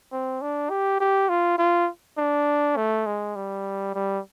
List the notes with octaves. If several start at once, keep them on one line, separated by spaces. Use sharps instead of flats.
C4
D4
G4
G4
F4
F4
D4
A3
G#3
G3
G3